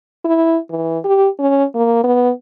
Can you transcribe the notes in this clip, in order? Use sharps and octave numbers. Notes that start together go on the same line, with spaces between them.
E4
E3
G4
C#4
A#3
B3